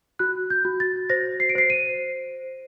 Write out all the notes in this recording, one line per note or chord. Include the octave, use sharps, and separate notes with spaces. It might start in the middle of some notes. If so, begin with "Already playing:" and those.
F#4 F#6
G6
F#4
A6
C5 A#6
C7
D7
C5 C7
D#7